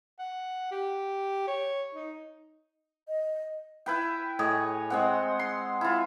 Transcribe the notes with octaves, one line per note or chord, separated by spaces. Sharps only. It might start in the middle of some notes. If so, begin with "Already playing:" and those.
F#5
G4
C#5
D#4
D#5
E4 B4 G5
A2 G#4 C#5 D#5
G#3 C4 F#5
C6
E4 F4